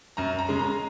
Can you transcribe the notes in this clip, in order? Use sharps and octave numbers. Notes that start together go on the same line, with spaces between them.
F#2 A#5
A#5
C#3 G#3
A#5